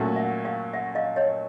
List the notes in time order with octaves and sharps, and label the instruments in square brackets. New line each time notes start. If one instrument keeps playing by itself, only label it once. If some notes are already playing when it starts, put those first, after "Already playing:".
Already playing: [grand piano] A#2 F#3 A3 C#4 F#4
[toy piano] E5 F#5
F5 G5
E5 F#5
D#5 F5
C#5 D#5